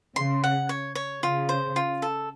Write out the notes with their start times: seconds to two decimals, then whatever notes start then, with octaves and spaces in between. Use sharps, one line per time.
0.16 C#3 C6
0.44 F#5
0.69 C#5
0.95 C#5
1.23 C#3 F4
1.49 C5
1.76 F4
2.02 A4